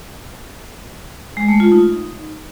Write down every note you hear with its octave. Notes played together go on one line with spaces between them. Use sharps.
G#3
A3
F4
D#4